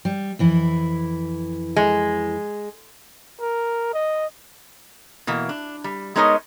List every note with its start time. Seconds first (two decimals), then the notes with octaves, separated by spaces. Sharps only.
0.05 G3
0.39 F2 E3 E4
1.76 G#3
3.41 A#4
3.94 D#5
5.27 B2 E3 A#3
5.49 D4
5.84 G3
6.16 G#3 B3 D#4 A#4 C#5 D#5